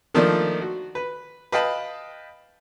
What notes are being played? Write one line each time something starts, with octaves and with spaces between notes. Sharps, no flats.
D#3 F3 A3 A#3 D4 A4
F#4
B4
B4 D#5 F5 G5 A5 B5